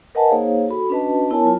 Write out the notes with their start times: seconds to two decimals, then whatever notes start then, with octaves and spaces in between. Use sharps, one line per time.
0.15 A#4 B4 D#5 F#5 G#5 A5
0.28 A#3 D#4 G#4 C5 C#5 F5
0.69 F#4 A4 B5
0.90 C#4 D4 F#4 B4 D#5 A5
1.30 B3 E4 A#4 C#5 G#5 A5
1.44 F#3 F4